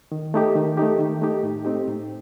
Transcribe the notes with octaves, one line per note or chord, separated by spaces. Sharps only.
D#3
A3 D#4 G4
D#3
A3 D#4 G4
D#3
A3 D#4 G4
A2
A3 C4 D#4 G4
A2